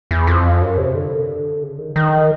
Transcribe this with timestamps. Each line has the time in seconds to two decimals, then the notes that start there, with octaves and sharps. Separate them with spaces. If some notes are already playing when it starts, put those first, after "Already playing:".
0.11 E2
0.27 F2
0.61 F#2
0.78 C3
0.95 D3
1.63 C#3
1.78 D#3
1.96 D#3